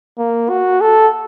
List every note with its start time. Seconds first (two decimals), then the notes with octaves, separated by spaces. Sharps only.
0.18 A#3
0.50 F#4
0.81 A4